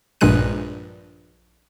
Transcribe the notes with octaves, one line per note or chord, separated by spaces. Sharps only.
A#1 G2 A#2 G#3 F#6 D#7